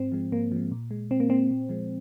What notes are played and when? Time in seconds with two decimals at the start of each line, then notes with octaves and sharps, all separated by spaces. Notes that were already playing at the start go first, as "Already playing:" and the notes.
Already playing: G#2 C4
0.12 F3 G#3
0.32 G#2 A#3
0.52 F3 G#3
0.71 A#2
0.91 G#3
1.11 A#2 C4
1.20 A#3
1.30 G#3 C4
1.51 A#2
1.69 F3 G#3